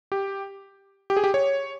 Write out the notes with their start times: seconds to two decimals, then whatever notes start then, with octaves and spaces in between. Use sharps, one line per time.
0.12 G4
1.10 G4
1.17 G#4
1.24 G4
1.34 C#5